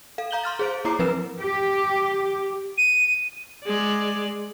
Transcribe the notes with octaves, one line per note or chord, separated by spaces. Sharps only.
A4 F5
F5 A#5 G6 F#7 G7
C6 F6 A6
G#4 C5 D7
A#3 E4 C#5 A#5 D6 C7
F3 C4 A#4 B4 E6 E7
G4
D#7
G#3 D5